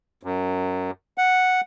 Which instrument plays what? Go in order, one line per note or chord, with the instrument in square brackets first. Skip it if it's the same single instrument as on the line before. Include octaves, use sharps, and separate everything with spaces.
[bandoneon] F#2
F#5